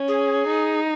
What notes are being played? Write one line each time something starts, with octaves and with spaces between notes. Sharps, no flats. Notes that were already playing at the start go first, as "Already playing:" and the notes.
Already playing: C#4
G#4
D#4